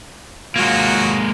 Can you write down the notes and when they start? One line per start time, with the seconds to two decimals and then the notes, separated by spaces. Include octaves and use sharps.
0.56 F#3 G#3 A#3 F4 F#4